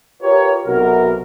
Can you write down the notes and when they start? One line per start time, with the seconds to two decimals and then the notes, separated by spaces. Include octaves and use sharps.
0.22 F4 G4 A#4 B4 C#5
0.66 B1 C3 F#4 A#4